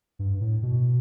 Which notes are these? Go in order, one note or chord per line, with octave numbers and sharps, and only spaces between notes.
G2
A2
B2